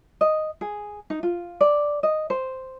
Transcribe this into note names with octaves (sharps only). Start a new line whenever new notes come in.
D#5
G#4
D#4
F4
D5
D#5
C5